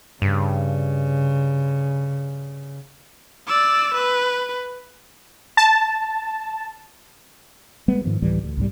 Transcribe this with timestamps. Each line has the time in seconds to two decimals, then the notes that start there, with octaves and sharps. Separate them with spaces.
0.22 G2 C#3
3.47 D5 E6
3.94 B4
5.57 A5
7.88 G3 G#3 B3
8.05 G#2 D#3 F3
8.22 D2 A2 E3 G3
8.44 D2
8.57 C2 G#2 G3